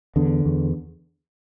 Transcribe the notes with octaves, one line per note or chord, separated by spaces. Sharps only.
E2 D3
E2